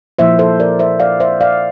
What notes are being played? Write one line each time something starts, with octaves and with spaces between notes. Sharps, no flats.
A#2 F3 A#3 E4 C5 E5
A4 C5
A#4 D5
C5 E5
D5 F5
C5 E5
D5 F5